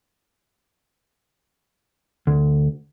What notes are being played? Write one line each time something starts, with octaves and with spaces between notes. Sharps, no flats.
D2